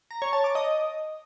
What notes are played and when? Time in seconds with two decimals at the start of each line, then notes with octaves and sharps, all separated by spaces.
0.11 A#5
0.22 C#5
0.33 A5
0.44 D6
0.55 D#5